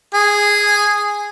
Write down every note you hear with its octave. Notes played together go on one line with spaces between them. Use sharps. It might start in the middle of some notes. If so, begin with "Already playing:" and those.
G#4